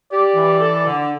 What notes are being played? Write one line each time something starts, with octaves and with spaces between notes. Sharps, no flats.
G4 D5
E3
A4
D3